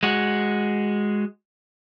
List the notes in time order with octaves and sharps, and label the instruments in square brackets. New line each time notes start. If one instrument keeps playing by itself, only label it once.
[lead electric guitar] G#3 F#4